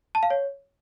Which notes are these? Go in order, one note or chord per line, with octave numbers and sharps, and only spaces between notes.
A5
F5
C#5